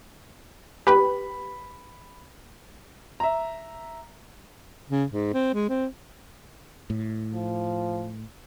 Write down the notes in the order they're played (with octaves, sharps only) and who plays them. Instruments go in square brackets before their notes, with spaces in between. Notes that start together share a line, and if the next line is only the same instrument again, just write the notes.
[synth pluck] G4 B4 [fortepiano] B5
[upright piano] E5 A#5
[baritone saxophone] C#3
G#2
C4
G#3
C4
[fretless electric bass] A2
[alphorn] F3